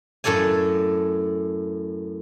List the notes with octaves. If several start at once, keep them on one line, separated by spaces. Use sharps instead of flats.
F#2 A2 A4 D5 G#5